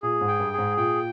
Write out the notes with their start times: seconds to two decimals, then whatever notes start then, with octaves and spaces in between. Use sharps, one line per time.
0.03 A#2 G#4
0.21 G#2
0.28 G5
0.39 G2
0.53 G#4
0.58 G#2
0.77 A#2 G5